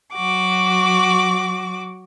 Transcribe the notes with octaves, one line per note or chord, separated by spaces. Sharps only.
F#3 F#4 D6